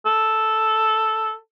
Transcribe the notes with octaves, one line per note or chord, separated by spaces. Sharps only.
A4